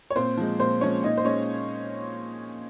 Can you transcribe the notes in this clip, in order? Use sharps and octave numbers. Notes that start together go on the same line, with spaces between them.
C#5
A#2 C4 C5
F3 G#3
A#2 C4 C5
F3 G#3 C#4 C#5
A#2 D#4 D#5
C5
G#3 C#4 C#5